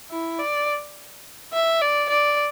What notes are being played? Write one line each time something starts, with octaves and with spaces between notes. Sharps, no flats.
E4
D5
E5
D5
D5